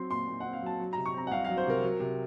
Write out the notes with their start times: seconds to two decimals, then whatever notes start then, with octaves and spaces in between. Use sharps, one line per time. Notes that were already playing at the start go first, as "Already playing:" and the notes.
Already playing: F#3 C4 C6
0.10 A#2 C6
0.27 A#2
0.40 C4 F#5
0.53 F5
0.62 F#3 A5
0.80 F#3
0.93 C3 A#5
1.06 C#6
1.14 C4 A#5
1.27 F#5
1.31 C2 F5
1.44 F#3 F5
1.57 C5
1.66 C3 A#4
1.83 F#3
2.00 C3